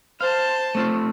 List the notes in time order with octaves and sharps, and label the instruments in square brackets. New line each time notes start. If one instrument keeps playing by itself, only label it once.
[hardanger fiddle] C5 A5 [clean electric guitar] F5
[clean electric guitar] A3 C4 F4